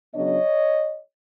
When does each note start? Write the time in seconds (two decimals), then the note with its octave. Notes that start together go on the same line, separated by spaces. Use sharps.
0.15 C#3 F#3 B3 D4 C#5 D#5